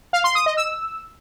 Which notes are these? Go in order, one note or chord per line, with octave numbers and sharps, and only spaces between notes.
F5
C6
D#6
D#5
E6